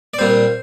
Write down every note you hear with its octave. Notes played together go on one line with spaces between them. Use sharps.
D5
A#2 G3 C4 C5